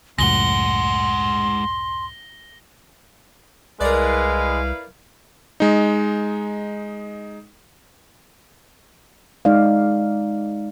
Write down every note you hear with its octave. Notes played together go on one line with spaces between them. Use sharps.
C#2 F#2 A2 G#3 F#5 C6 A#6 G7
C2 G#3 E4 A#4 B4 D5 F5
G#3 D#4
G#3 D#4 D5 F5